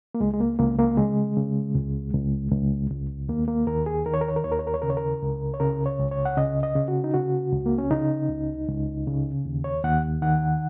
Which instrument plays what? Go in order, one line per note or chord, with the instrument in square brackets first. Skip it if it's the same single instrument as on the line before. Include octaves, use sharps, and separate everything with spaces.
[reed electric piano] A#3
C#2 G#3
G#3
A#3
C#2 A#3
A#3
C#3 G#3
C#3
C#2
C#2
C#2
C#2
D#2 A#3
A#3
D#2 A#4
G#4
D#3 A#4
C#5
A#4
C#5
A#4
D#2 C#5
A#4
C#5
A#4
C#5
C#3 A#4
C#5
A#4
C#2
C#5
C#3 A#4
C#5
C#2
C#5
F#5
C#3 D#5
D#5
C#3
F#4
D#4
C#3 F#4
C#2
A#3
C#4
C#3 D#4
C#2
C#2
C#3
D#2
C#5
D#2 F#5
D#3 F#5